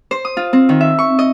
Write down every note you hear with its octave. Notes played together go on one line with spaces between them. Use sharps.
C5
D#6
F4
C4
D#3
E5
C#6
D#5